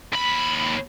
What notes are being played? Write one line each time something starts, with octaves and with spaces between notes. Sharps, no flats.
D#2 B5